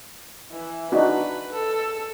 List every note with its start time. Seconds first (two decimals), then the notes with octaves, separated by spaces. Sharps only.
0.52 E3
0.92 D4 D#4 F#4 B4
1.53 A4